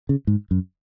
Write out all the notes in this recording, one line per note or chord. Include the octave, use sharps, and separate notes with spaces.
C#3
G#2
F#2